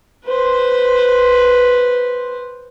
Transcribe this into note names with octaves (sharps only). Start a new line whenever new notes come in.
B4 C5